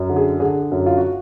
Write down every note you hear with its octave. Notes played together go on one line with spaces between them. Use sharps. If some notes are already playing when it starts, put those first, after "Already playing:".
Already playing: F#2
D3
G#4
D3 G#4
F#2
F4
F#4